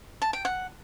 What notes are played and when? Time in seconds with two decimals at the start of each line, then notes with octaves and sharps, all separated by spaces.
0.22 A5
0.33 G5
0.45 F#5